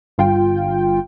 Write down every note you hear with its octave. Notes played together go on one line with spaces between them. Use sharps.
G1 F4 G5